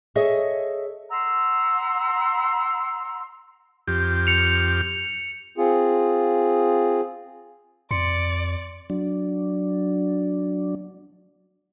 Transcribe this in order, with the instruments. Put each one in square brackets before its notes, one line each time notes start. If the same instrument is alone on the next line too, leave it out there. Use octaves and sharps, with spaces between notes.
[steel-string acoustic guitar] G#4 A4 C#5 D#5 E5
[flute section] F#5 A#5 C6 E6
[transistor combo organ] F2 G4
[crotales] C#7 F7
F7
[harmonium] C4 F4 G#4
[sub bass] F2 [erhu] D5 [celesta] C6 C#7
[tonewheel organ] F#3 D4